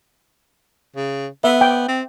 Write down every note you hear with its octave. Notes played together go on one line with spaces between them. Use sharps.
C#3
B3 E5
G5
C4